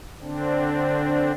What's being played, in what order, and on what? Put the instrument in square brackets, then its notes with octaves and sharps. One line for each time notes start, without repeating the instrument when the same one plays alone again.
[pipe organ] D3 C4 D4